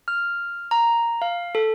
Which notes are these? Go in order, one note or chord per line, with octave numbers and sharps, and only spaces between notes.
F6
A#5
F5
A4